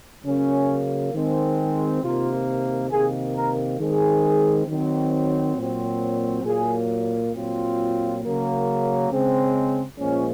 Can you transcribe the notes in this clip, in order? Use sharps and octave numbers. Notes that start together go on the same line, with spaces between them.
C#3 F#3 A#3 C#4
D#3 G#3 C4
C3 D#3 A#3 F4
C3 D#3 A#3 G#4
A#4
D#3 G#3 C4 G#4
D#3 F#3 C4
A#2 F#3 C4
A#2 F#3 A#3 G#4
A#2 F#3 C4 F4
C#3 F#3 A#3
C#3 G#3 C4
A#2 F3 G#3 C#4